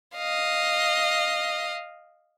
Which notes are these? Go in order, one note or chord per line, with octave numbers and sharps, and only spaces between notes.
D#5 F5